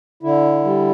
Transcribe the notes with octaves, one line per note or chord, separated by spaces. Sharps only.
D3 E4
G3